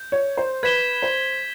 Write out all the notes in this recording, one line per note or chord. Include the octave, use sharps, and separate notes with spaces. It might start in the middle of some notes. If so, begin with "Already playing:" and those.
Already playing: G6
C#5
C5
B4 G#6 B6 E7 G7
C5